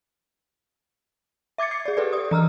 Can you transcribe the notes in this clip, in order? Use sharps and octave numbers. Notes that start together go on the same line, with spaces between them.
E5 D6 G#6 A6 C#7
D6 G#6 C7
G#4 D5
G4 A4 B4 D5
D5 D#6
E3 A#5 E6 F6